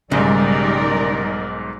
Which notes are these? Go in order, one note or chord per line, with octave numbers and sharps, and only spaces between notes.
B1 G#2 C#3 G3 D#4 A#4 D5